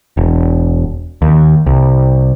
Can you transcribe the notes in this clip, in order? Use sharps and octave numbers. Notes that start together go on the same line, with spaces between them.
E1
D#2
C2